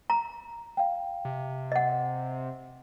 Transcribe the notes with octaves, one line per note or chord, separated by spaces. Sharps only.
A#5
F5 G5
C3
D#5 F#5